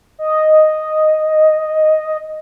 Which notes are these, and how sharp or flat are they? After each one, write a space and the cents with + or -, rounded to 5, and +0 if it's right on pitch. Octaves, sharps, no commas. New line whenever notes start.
D#5 +0